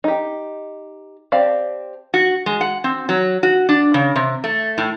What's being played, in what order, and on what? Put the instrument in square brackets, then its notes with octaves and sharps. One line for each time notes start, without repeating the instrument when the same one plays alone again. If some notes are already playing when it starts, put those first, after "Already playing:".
[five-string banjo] D#4 G4
C4 G4 D5 F5 A5
[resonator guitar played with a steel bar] F#4
G#3
F#5
C4
F#3
F#4
D4
C#3
C3
A3
A2